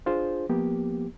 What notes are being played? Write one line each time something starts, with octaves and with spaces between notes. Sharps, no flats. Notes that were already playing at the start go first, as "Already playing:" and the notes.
D4 F4 G#4 C5
F3 A#3 B3 G4